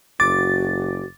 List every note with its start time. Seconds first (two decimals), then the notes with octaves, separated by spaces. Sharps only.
0.20 F#1 F#4 D6 A6